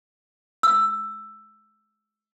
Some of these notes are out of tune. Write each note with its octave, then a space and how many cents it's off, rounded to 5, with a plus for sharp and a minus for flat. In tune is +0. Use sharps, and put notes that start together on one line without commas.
E6 +10